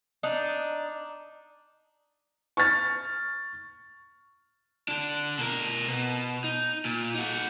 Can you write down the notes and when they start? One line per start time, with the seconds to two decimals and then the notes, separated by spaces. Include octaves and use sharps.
0.23 D4 D#4
2.57 C#6 F6 A6
4.88 D3 D4
5.38 B2 A#4
5.88 B2
6.44 D#4
6.85 A#2
7.14 D#4 F#4